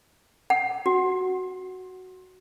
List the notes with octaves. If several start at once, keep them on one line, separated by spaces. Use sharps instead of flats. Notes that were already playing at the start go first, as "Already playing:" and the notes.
F#5
F#4